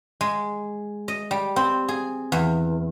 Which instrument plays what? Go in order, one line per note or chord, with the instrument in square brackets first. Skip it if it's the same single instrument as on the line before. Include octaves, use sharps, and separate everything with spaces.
[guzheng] G#3
D#5
G3
C4
G#4
E2